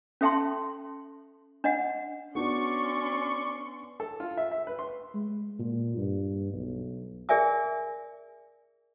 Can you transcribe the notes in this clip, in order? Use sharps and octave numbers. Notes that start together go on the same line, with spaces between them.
C#4 A4 E5 G5 A5 C6
D4 D#5 F#5
B3 C#4 D4 F#4 D5 C6 C#6
A4
F4
E5
E5
B4
C6
G#3
A#2
G2
B1
G#4 A#4 D5 E5 G#5 D#6